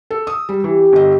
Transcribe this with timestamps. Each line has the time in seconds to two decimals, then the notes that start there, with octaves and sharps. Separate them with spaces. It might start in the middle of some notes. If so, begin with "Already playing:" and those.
0.11 A4
0.27 D#6 E6
0.49 G3
0.64 E3 G4
0.93 G1 D#5